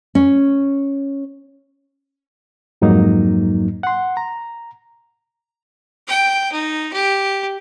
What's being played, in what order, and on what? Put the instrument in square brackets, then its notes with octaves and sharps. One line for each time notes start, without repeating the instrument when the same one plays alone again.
[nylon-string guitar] C#4
[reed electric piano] F2 G#2 F#3 A#3 D#4
F#5 C6
A#5
[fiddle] G5
D#4
G4